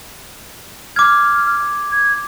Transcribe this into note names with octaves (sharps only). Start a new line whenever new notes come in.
D6 F6 G#6
G#6